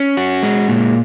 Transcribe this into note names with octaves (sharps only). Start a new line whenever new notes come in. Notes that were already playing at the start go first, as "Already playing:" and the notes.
Already playing: C#4
F#4
G#3
A#2